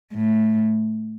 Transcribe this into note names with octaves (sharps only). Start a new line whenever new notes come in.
A2